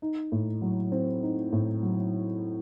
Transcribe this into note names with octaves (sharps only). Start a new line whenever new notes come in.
D#4
A2
F#3
C4
D#4
A2
F#3